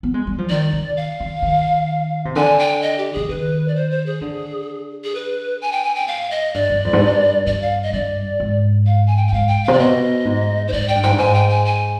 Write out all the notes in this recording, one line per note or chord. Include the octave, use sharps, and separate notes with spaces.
B3
G#3
G3
F3
D#3 D5
D#3
F5
D#3
D#3
C3
D3 G#5
G5
D#5
G4
D3 G#4
D#3 B4
D5
C5
C5
G#4
D3
G#4
B4
G#5
G5
G#5
G5
G#2 F5
D#5
G2 D5
G2
F2
G#2
G2
G2 D5
F5
D#5
G2 D5
G#2
F5
G#5
G5
G5
G#2 F5
G5
C3 F5
D5
B2 D#5
G#2
C5
G#2 D5
G5
G2
G#2 G5
G2
G#2 G#5
G5
G#5
G#5